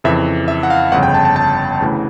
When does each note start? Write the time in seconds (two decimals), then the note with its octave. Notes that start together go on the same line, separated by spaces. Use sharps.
0.04 F2 C#3 E3 E5
0.48 E5
0.63 F#5
0.70 F5
0.92 G1 F2 C#3 F#5
1.03 G5
1.14 A5
1.25 A5
1.36 A5
1.81 D2 C#3 E3